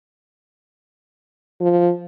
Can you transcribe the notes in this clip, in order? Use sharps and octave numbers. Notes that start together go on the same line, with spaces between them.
F3